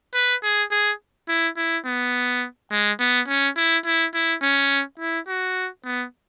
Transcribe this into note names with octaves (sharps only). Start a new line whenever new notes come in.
B4
G#4
G#4
E4
E4
B3
G#3
B3
C#4
E4
E4
E4
C#4
E4
F#4
B3